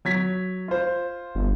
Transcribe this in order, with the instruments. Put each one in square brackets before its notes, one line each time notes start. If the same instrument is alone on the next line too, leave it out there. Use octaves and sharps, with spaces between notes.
[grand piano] F#3 G#6 B6
F4 C5
[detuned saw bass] G1